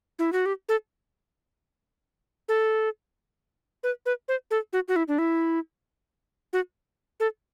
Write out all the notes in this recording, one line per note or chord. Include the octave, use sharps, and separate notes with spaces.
E4
F#4
G4
A4
A4
B4
B4
C5
A4
F#4
F#4
E4
D4
E4
F#4
A4